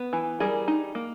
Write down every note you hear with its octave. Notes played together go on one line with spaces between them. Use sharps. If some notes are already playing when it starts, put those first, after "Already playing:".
Already playing: B3
E3
G3 G#4 A#4
D#4
A#3